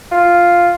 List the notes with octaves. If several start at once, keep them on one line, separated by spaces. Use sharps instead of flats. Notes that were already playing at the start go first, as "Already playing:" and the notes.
F4